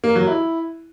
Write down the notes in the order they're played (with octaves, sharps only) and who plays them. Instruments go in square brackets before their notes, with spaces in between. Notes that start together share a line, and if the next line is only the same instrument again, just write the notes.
[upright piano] A#3
F#3
E4